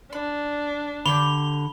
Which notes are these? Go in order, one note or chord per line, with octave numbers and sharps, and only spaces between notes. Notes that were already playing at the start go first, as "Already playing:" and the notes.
D4 B5
D3 G4 C#5 B5 D6 F7 G7